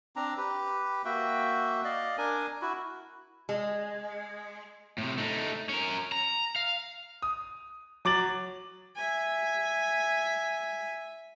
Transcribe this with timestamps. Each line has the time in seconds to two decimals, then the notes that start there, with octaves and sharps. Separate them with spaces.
0.16 C4 D4 A#5
0.37 G4 B4
1.05 A#3 F#4 E5 G5
1.84 D5 D#5 F5
2.18 D4 A#4 G#5
2.61 E4 F#4
3.49 G#3
4.98 A2 C3
5.18 A3 D#4
5.69 C#4 A#4
6.12 A#5
6.56 F5
7.22 D#6
8.05 F#3 D6 A6 F#7
8.96 E5 G#5